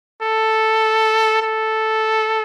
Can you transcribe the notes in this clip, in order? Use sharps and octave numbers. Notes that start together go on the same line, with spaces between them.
A4
A4